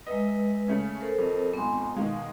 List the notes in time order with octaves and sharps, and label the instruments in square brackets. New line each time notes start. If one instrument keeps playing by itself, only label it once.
[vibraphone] G#3 B4 [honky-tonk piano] D#5 E5
[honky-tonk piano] C#3 A3 C#4
[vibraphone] A4 A#4 C5
[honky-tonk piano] F2
[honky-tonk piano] G#1 F2 [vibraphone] B3 G#5 C6
[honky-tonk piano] B2 D#3 G#3 [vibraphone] F5